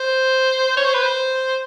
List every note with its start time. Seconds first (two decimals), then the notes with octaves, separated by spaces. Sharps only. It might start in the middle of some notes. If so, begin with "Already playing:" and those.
Already playing: C5
0.77 C#5
0.85 C5
0.94 B4
1.03 C5